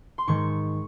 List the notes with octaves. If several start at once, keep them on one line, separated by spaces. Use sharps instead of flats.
C6
G#2 D#3 G#3 C#6